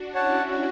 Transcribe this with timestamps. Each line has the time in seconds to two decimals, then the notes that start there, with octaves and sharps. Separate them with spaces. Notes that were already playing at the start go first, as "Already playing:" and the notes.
Already playing: D4 F#4
0.14 C#4 E4 C#5 F#5 A5
0.50 F#4